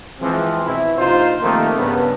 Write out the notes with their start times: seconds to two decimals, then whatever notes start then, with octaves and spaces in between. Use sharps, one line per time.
0.20 E3 F3 G#3 C4
0.64 B2 C4 E4
0.98 A#1 C3 F3 D#4 F4 C5
1.42 C3 D#3 F3 A3 A#3
1.76 G2 C#3 B3